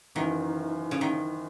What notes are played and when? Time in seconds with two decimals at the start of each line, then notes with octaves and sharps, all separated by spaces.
0.15 F#1 F#2 D#3 E3
0.91 C#3
1.01 D#3